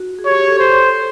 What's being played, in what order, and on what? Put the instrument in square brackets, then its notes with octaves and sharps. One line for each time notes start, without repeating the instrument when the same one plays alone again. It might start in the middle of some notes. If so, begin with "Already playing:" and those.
Already playing: [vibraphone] F#4
G#4
[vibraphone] G4 [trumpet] C#5
[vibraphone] G4
A4
[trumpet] C5